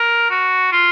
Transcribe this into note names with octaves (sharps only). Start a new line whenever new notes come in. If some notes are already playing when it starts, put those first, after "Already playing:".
Already playing: A#4
F#4
F4